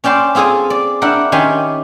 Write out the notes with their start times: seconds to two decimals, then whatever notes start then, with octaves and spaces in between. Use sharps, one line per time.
0.04 C#4 D5 G5 A5 C6
0.35 C4 F4 G#4 A4 G#5
0.70 D5
1.02 D4 E4 A#4 F#5 G5
1.32 D#3 C#4 G4 G#5 B5 C6